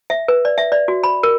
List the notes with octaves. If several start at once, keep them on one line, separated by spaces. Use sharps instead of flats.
E5
B4
D5
E5
D5
F#4
B5
A#4